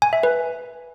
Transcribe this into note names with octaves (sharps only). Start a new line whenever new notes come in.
G#5
E5
B4